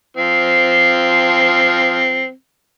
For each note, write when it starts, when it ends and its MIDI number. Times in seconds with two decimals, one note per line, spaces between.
0.17 2.31 53
0.17 2.31 60